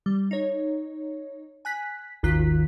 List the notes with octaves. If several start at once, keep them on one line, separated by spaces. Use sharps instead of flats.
G3
D#4 C#5
G#5 F#6 B6
G#1 D#2 D#3 F4 F#6 B6